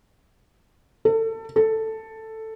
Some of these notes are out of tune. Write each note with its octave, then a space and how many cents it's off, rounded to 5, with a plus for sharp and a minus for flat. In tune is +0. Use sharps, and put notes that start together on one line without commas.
A4 +30
A4 +5